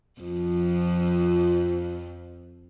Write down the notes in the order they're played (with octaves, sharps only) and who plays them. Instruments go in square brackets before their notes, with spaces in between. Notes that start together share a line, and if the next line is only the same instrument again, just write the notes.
[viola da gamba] F2 F3